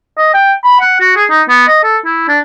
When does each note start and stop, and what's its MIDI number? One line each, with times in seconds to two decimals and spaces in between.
0.17 0.33 75
0.34 0.54 79
0.64 0.76 83
0.80 0.96 78
1.00 1.14 66
1.16 1.25 68
1.30 1.42 63
1.49 1.67 59
1.68 1.83 75
1.84 1.97 69
2.05 2.27 64
2.28 2.40 62